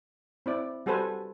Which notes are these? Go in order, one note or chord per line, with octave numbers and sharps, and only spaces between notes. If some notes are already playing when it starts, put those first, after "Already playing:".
C4 E4 D5
G3 F#4 A4 B4 C5 G#5